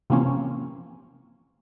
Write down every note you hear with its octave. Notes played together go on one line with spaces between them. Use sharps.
C3 E3 F3 A#3 C4 C#4